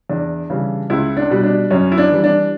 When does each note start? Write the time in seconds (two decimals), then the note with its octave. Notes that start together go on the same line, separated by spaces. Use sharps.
0.10 E2 D4
0.50 C#3 E3 G3
0.90 C#2 E4
1.17 D4
1.30 B2 G3
1.43 D4
1.70 F#2 C#4
1.92 E4
1.98 D4
2.11 E3 G3
2.24 D4